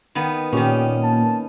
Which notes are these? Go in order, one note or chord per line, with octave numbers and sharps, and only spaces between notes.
D#3 B3
A#2 D#3 C#4 G4
A5